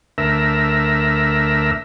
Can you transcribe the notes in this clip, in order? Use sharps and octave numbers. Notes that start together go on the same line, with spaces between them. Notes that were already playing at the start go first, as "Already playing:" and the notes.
D2 A#4 E5